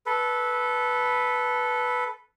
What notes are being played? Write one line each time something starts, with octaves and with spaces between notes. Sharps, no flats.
A4 B4